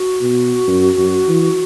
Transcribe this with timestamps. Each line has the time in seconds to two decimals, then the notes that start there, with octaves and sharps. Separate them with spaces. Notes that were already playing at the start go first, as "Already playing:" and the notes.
Already playing: F#4
0.21 B2
0.68 F#2
0.98 F#2
1.28 E3